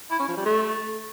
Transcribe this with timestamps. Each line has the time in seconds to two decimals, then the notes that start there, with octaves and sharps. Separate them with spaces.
0.11 E4
0.20 C#4
0.28 F3
0.37 G3
0.46 A3